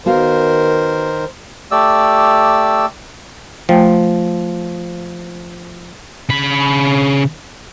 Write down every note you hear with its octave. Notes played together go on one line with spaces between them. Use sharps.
D#3 B3 F#4 A#4 C5 F5
A3 G4 D5 E6
F3 A3 G5
C#3 B5